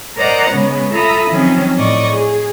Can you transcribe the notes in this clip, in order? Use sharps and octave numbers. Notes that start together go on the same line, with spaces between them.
A#4 C5 D5 D#5 F#5 A#5
C#3 G#3 B3 C#4
F4 A4 E5 A#5 B5 D#6
D#3 F3 F#3 C4 C#4
A2 D5 D#5 C#6
G#4